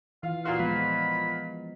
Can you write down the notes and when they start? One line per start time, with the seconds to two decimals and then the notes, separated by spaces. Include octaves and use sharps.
0.23 E3 F4 F5
0.45 A#2 F4 F#4 C6
0.59 F3 G#3 B3 B5